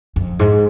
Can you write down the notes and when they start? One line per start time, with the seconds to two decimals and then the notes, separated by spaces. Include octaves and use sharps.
0.16 F2
0.39 G#2